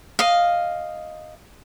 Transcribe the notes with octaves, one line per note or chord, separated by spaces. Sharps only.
D#5 F5